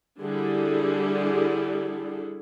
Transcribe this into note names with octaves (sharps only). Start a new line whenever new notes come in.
D3 G3 E4 G#4 A4